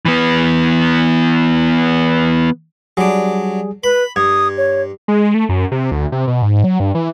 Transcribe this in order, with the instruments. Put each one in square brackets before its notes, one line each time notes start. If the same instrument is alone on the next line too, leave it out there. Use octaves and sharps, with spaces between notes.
[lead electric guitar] E3 B3
[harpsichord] F#3 D4 [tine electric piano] G3 G#4
[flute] B4 [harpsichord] B5
[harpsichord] G2 [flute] D#6 [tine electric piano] G#6
[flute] C#5
[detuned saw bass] G#3
A3
F#2
C3
D2
C3
B2
G#2
F#3
G2
E3